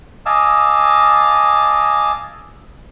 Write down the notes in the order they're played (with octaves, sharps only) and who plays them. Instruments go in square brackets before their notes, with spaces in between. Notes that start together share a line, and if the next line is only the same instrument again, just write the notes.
[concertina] D#5 F5 G#5 A5 D6 E6